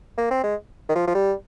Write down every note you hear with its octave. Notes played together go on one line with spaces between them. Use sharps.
A#3
C4
G#3
D#3
F3
F3
G3